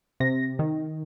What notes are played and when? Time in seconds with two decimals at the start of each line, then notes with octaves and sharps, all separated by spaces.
0.20 C3 A#6
0.59 D#3